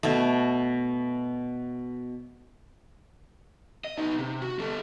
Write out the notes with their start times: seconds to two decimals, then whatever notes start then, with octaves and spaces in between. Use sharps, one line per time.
0.03 B2 A3
3.85 D#5
3.97 B3 D#4
4.18 C3
4.42 F#4
4.59 G3 A4